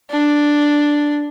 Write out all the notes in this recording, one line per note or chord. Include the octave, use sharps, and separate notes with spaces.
D4